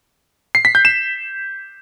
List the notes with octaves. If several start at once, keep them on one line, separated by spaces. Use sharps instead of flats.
C7
B6
G6
E7